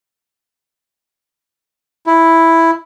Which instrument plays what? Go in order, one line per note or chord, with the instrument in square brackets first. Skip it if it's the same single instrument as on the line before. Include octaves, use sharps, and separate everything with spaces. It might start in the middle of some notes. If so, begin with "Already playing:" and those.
[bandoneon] E4